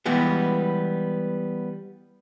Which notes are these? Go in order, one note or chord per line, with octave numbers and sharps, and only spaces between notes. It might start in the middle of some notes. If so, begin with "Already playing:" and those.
E3 G3 G#3 B3